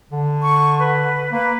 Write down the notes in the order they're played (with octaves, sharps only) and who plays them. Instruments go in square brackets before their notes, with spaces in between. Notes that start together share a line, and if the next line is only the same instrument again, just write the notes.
[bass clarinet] D3
[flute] C#6
B4
[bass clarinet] A#3 [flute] B4